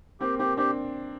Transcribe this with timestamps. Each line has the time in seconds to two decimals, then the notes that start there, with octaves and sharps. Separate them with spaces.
0.20 A#3 C4 G4
0.39 A#3 C4 G4
0.57 C4 D4 G4